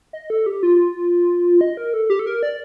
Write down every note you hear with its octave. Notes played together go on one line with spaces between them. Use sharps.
D#5
A4
G4
F4
D#5
A#4
A4
G4
A4
A#4
D5